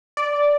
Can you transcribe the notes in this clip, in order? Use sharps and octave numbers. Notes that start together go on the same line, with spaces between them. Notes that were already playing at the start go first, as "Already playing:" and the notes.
D5